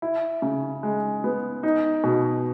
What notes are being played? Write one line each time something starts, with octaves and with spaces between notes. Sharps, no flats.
E4
C#3
G#3
B3
D#4
B2